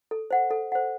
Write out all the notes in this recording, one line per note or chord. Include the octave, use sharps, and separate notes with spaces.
A4
C5 F#5
A4
C5 F#5